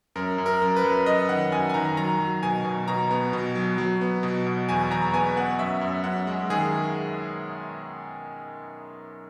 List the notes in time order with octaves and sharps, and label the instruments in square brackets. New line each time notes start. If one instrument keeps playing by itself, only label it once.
[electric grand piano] F#2 A#4
F#2
A#4
F#2
B4
F#2
F#2 D#5
D#3 F#5
F#2 G#5
G#5
D#3 A#5
F#3 A#5
F#3
B2 G#5
B2
B2 A#5
B3
B2
F#3
F#3
B3
B2
B2
E2 G#5
E2 A#5
B3 G#5
B3 F#5
F#2 E5
F#2
F#2 F#5
G#3
D#3 G#4